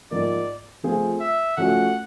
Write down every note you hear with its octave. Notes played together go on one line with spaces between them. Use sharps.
G#2 F3 A#3 D5
F3 A3 C4 F4 G#4
E5
F3 A3 C#4 F#4 F#5